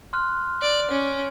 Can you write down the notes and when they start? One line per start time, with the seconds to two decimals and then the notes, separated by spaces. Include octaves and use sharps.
0.13 C6 F6 F#6
0.62 D5
0.91 C#4